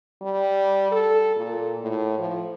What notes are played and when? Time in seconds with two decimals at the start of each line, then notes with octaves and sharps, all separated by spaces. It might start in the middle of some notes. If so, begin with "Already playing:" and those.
0.22 G3
0.92 A4
1.36 A#2
1.81 A2
2.19 F3